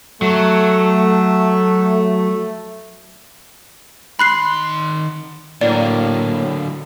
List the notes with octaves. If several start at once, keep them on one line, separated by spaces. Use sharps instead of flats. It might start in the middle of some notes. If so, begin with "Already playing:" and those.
F#3 A3
D#3 B5 C6 F#6 C7
A2 D3 F#3 A#3 D5